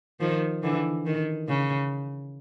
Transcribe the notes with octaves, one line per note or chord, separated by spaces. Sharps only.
D#3 F3
D3 E3
D#3
C#3